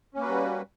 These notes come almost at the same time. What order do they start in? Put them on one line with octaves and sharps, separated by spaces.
C#4 A#3 B4 F#4 G3